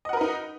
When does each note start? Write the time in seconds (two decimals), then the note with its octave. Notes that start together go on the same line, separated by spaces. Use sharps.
0.05 D#5
0.09 F#5
0.13 A#4
0.17 B4
0.21 D#4